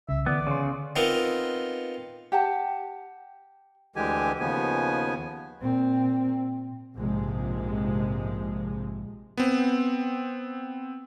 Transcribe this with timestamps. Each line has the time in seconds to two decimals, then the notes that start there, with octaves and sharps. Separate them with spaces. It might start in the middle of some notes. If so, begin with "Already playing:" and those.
0.09 C2 C#3 E5
0.26 D3 E3 B3 D5
0.47 C#3 C6 C#6
0.96 B3 C4 D#4 F4 A#4
2.32 G4 F#5 G5 A5
3.96 D2 D3 E3 G#3 G4 G#5
4.40 D#2 C#3 F3 B3 G#5
5.61 A#2 C4
6.95 A#1 G#2 C3 F3 G#3
9.37 B3 C4